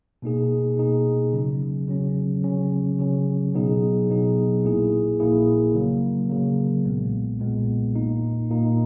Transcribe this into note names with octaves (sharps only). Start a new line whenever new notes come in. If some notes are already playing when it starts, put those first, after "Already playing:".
B2 A#3 D#4 G#4
B2 A#3 D#4 G#4
C#3 F#3 C#4
C#3 F#3 C#4
C#3 F#3 C#4
C#3 F#3 C#4
B2 F#3 B3 D#4 G#4
B2 F#3 B3 D#4 G#4
A#1 A#2 A#3 E4 G#4
A#1 A#2 A#3 E4 G#4
C#3 F#3 A#3
C#3 F#3 A#3
B1 A#2 G#3 B3
B1 A#2 G#3 B3
A#2 A#3 D#4
A#2 A#3 D#4